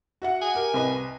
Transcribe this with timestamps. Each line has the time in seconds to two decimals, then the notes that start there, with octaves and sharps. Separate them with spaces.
0.22 F#4 E5 F#5
0.42 G#5
0.55 G4 A#4
0.74 C2 B4 D#5